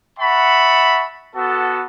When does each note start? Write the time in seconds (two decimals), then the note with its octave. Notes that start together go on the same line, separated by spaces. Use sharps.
0.19 E5 F#5 A5 B5 C#6
1.35 B3 F#4 A4